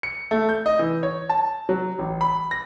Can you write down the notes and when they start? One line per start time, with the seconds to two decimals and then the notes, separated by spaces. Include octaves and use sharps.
0.03 C#7
0.31 A3
0.49 G6
0.66 D#5
0.79 E3
1.03 C#5
1.29 A5
1.69 F#3
1.99 A1
2.21 B5
2.51 A#6